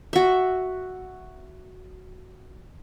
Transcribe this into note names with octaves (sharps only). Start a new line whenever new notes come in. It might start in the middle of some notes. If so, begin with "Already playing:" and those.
F#4 E5